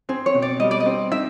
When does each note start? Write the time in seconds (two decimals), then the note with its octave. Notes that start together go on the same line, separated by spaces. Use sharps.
0.09 C4 G#4
0.26 C#5
0.34 B2
0.42 D5
0.60 G3 D#5
0.71 D5
0.80 D#5
0.86 C4
1.11 D#4 E5